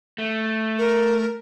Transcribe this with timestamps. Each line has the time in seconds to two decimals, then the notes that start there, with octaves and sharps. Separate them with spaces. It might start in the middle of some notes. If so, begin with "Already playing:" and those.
0.18 A3
0.78 A#4